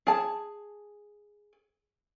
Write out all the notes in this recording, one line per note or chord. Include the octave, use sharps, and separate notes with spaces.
G#4 A5